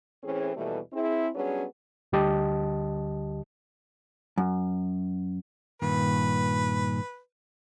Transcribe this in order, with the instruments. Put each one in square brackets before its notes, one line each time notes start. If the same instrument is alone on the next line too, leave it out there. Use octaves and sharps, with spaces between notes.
[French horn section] A2 E3 C4 C#4 G#4
D#2 B2 E3 G3 A3
C4 E4 G#4
F#3 G3 B3 C#4 D4 G#4
[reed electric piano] D2 D3 G3 G4 D#5 A5
[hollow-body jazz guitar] F#2
[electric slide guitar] G2 A#2 D#3 [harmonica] B4